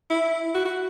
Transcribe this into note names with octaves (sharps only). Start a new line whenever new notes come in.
E4
F#4
F#4